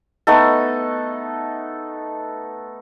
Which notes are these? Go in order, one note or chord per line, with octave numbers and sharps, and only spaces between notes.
A3 B3 D#4 A4